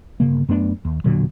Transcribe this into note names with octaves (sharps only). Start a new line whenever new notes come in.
G1 C#3 A#3
F#2 A3 B3 D4
D#2
E1 A#2 D3 F#3